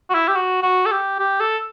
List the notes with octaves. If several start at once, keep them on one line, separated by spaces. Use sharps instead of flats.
F#4
E4
G4
F#4
F#4
A4
G4
G4
A4